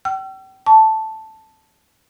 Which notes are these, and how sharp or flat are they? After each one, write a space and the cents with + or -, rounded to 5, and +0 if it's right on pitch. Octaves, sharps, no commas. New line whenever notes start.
G5 -40 E6 +45
A5 +0 C#6 +30